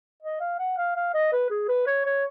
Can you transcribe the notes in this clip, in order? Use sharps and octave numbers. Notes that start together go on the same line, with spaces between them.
D#5
F5
F#5
F5
F5
D#5
B4
G#4
B4
C#5
C#5